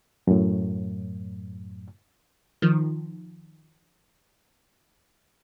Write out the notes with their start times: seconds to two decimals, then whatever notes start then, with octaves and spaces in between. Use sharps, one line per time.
0.27 F#2 A2
2.62 D#3 F3